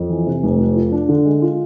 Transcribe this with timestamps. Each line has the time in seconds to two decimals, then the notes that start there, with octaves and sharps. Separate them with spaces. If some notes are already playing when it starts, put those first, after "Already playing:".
Already playing: F2
0.09 E3
0.27 C3
0.43 F1
0.59 F2
0.75 F4
0.92 D4
1.09 D3
1.25 G#3
1.42 F4